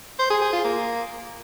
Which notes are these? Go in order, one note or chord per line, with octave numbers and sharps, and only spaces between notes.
C5
G#4
G#4
F4
A#3